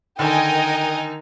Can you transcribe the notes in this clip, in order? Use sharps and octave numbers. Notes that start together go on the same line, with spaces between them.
D3 D#3 D#4 A#4 D#5 G5 G#5